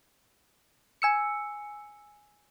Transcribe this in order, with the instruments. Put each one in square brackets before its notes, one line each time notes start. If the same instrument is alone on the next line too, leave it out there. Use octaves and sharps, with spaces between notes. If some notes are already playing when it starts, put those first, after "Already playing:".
[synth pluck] G#5 E6 C#7